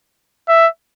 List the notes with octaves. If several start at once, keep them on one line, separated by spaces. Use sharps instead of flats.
E5